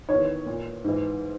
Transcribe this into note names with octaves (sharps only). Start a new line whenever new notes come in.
E2 D#3 C#5
A#2
G#2 E3